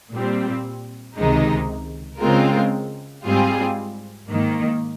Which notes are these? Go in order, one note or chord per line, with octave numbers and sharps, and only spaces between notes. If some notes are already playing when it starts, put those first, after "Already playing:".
A#2 G3 C4
C#2 C3 D#3 G#3 D#4
C#3 G#3 C4 F4 A#4
G#2 G3 C4 F4 G#4
G#2 D#3 A#3